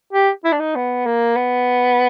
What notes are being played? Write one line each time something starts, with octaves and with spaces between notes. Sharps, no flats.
G4
E4
D4
D#4
B3
A#3
B3